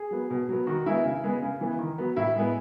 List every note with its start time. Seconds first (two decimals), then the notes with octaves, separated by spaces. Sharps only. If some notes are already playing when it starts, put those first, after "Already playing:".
Already playing: G#4
0.11 F#3 B3
0.30 B2
0.49 F#3 B3
0.67 D#3 F#4
0.86 G#3 B3 E4
1.04 C#3
1.24 G#3 B3
1.42 C#3
1.61 E3 B3
1.79 D#3
1.98 F#3 B3
2.16 A2 E4
2.36 G#3 B3